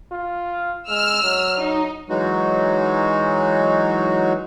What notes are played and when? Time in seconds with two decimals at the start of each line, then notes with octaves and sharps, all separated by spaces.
0.12 F4
0.89 G#3 E6 F6
1.23 F#3
1.58 D#4
2.10 E3 F#3 G#3 D#4 F#4